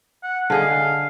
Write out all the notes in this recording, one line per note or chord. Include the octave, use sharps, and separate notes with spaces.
F#5
D3 G#4 D#5 F5